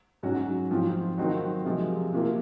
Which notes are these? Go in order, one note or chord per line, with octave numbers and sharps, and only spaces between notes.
G#2 F#3 C#4 F#4
G#2 F3 C4 F4
D#3 F#3 C4 D#4 F#4
C3 F3 G#3
C3 F#3 A#3 F4